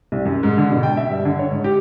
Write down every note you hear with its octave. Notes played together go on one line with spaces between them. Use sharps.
C2
F#2
G#2
D3
B2
G5
E5
G2
D3
C#5
G#2
G4